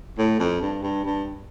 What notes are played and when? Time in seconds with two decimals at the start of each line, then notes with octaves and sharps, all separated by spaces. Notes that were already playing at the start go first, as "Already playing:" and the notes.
0.18 A2
0.40 F2
0.62 G2
0.83 G2
1.05 G2